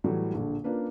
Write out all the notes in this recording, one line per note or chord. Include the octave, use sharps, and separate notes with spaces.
A2 E3 F#3 G3
A#1 D3
A#3 C#4 D4 F4 B4